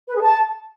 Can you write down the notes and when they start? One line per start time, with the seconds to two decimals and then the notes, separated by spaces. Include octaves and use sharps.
0.08 B4
0.15 G#4
0.21 A5